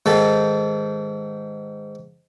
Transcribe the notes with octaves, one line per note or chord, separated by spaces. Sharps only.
G#2 D#3 A4